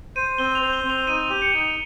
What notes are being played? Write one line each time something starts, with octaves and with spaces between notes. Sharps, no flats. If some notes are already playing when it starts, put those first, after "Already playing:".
C5 D#7
C4 G7
F7
C5
G7
C4
F7
D#4 D#7
G4
C#7
D#4 D#7
F7